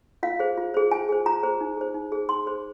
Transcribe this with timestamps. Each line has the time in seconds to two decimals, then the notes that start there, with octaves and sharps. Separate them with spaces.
0.23 F4 F5
0.39 G#4 C5
0.57 F4
0.74 G#4 C5
0.91 F4 G#5
1.09 G#4 C5
1.26 F4 A#5
1.43 G#4 C5
1.61 D#4
1.77 G#4 C5
1.94 D#4
2.12 G#4 C5
2.29 D#4 C6
2.46 G#4 C5